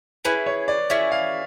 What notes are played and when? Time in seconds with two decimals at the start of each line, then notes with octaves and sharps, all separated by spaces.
0.25 C#4 E4 G#4 B4
0.46 C#5
0.68 D5
0.90 C#4 E4 G#4 E5
1.12 F5